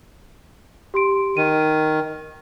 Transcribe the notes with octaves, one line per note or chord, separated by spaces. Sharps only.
G4 C6 D7
D#3 D#7